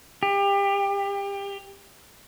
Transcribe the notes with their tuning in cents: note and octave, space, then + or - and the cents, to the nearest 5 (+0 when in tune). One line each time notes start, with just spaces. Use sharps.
G4 +30